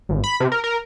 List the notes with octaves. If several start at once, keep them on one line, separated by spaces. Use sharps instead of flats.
G#1
B5
C3
A#4
A#4